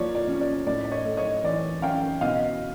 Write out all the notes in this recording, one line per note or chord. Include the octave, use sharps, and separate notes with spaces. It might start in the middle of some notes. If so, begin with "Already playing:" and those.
Already playing: F3 A#3 C#5 D5
D5
C#4
D5
A2 D5
D5
C#5 D#5
A3
C#5 D#5
E3 D5
C#4 F5 G5
B2 D#5 F5